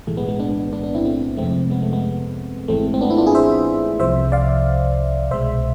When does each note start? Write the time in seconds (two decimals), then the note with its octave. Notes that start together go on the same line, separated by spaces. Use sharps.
0.07 B1 A2 E3 G#3 A3
0.17 G#3 B3
0.29 G#3 B3
0.40 B3 D4
0.73 B3 D4
0.83 B3 D4
0.95 C4 E4
1.05 A3 C4
1.37 F2 C3 F3 G#3 A3 C4
1.70 G#3 B3
1.82 A3
1.92 G#3 B3
2.68 G#1 G#2 E3 G#3 A3 C4
2.94 C4
3.01 B3 D4
3.10 C4 E4
3.17 D4 F4
3.27 E4 G#4
3.35 C5 E5
4.00 C2 C3 F3 C5 E5
4.32 D5 F5
5.30 C2 B2 G#3 C5 E5